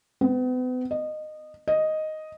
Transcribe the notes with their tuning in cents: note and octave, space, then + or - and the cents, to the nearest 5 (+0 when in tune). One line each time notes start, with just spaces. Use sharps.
B3 +40
D#5 -20
D#5 +0